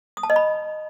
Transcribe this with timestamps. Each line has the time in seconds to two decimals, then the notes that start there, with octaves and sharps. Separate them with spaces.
0.17 D#6
0.23 A5
0.30 D#5
0.36 B5